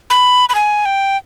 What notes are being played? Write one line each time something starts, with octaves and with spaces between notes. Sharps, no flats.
B5
B5
G#5
G5